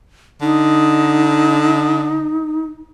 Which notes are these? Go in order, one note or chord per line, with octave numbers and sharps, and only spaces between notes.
D3 D#4